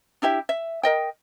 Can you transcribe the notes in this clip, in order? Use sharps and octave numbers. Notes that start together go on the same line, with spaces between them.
D4 E4 G4 E5
E5
A#4 D#5 G5